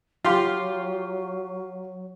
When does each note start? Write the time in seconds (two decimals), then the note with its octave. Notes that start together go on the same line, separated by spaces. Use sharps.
0.25 F#3 F4 G4 C6